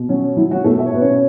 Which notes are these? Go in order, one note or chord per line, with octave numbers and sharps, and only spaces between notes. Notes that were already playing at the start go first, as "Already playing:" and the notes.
Already playing: B2
F#3 C#4
F#3 E4
F#3 F#4
B2 A3 A4
E5
C#5
B2 B4
C#4 C#5